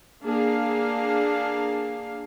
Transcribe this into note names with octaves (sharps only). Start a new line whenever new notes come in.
A#3 D4 G#4 F5